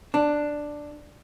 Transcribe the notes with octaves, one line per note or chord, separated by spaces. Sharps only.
D4